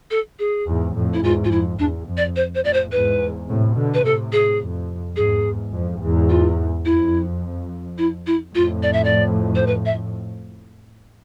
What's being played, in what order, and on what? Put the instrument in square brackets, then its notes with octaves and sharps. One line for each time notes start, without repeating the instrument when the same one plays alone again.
[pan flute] A4
G#4
[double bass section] E2 G#2
F2 A2
[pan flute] E4
[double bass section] E2 G#2 [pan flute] F4
[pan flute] F4
[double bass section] F2 [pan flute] E4
[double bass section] E2 [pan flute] D4
[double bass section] F2
[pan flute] D5
C5
C5
[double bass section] F2 A2 [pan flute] D5
[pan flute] C5
[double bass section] E2 G#2 [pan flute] B4
[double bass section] A2 C3
B2 D3
[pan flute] B4
[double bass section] A2 C3 [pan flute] A4
[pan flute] G#4
[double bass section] F2
[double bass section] E2 G#2 [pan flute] G#4
[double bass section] F2
E2 G#2
[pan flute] F4
[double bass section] F2 [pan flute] E4
[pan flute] E4
E4
[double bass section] F2 A2 [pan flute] F4
[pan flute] D5
E5
D5
C5
B4
E5